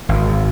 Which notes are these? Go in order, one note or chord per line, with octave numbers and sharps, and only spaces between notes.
G#1